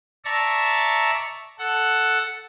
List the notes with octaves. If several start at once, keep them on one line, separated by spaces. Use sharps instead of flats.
D5 E5 A5 A#5 C#6
A4 F#5